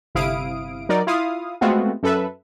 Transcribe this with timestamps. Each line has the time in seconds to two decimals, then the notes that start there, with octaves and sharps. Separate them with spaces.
0.15 G1 C3 E4 F5 D#6 D7
0.89 F#3 D#4 A#4 D5
1.07 E4 F4 F5 D#6
1.61 G#3 A3 B3 C4 F4 F#4
2.03 F#2 A4 B4 E5